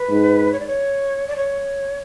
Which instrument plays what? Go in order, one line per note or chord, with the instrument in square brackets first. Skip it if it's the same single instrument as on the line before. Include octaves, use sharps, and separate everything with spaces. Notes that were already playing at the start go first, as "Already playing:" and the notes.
Already playing: [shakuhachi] B4
[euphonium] G#2
[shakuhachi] C#5
D5
C#5
D5
C#5